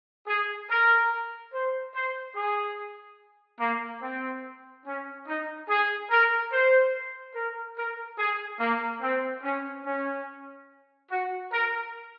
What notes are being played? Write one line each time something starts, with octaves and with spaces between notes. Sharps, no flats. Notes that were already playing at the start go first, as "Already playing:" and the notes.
G#4
A#4
C5
C5
G#4
A#3
C4
C#4
D#4
G#4
A#4
C5
A#4
A#4
G#4
A#3
C4
C#4
C#4
F#4
A#4